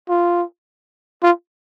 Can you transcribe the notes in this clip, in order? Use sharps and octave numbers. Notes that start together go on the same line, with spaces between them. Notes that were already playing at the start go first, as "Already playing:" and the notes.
F4
F4